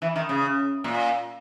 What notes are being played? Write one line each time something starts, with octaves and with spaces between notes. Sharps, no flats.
E3
D#3
C#3
A#2